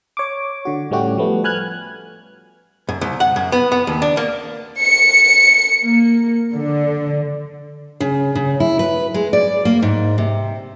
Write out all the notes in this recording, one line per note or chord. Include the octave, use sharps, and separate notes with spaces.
C#5 D6
D3 F#4
A2 G3 A3 C#4 F#4 G4
F3 G3 A3 B3
B4 G#5 F6 F#6 G#6
F#2
C2
F#5
F#2
B3
B3
D#2
D4
A#3
C#7
A#3
D3
C#3
C#3
E4
B4
G#3
D5
A#3
G#2
C3